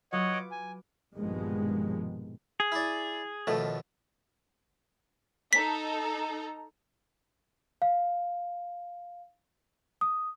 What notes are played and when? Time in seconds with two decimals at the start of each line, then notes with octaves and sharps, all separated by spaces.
0.13 F#3 F4 B4 C#5 D#5 F#5
0.33 D6
0.51 G#5
1.16 A#1 G2 B2 D#3 F3 G#3
2.60 G#4
2.72 E4 D5
3.47 D#2 B2 F3 A3
5.53 D#4 A4 A#5 B6
7.82 F5
10.01 D#6